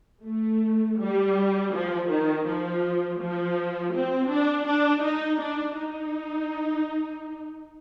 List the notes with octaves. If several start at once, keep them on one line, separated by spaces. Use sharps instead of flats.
A3
G3
F3
D#3
F3
F3
C4
D4
D4
D#4
D4
D#4